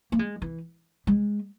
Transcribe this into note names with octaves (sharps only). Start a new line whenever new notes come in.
A#3
G#3
E3
G#3